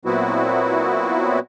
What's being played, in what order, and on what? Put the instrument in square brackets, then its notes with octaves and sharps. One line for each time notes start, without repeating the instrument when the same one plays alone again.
[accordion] A#2 F#3 B3 C4 E4 F#4